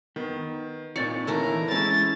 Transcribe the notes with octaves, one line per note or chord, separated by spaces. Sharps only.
D#3 B3
A#2 C4 D#4 C#5 D5 A6 C#7
E3 A3 E4 A#4
G#3 C#4 E4 A6